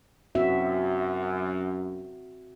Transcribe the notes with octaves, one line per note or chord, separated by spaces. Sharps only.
F#2 C4 F#4 E5